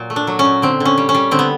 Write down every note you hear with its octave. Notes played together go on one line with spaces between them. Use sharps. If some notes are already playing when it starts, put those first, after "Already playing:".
Already playing: A#2 F#3
A3
D4
F#3
C#4
A#2
D3 C4
D3
C#4
G3
C#4
G3
D3 C4
B3